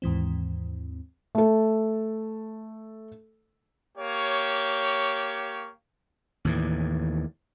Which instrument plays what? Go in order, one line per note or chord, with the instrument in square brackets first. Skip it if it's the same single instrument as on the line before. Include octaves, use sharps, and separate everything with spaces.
[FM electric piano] D#2 G#2 E3 C4
[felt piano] A3 A4
[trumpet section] A#3 G4 C#5
[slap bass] D#2 A2 E3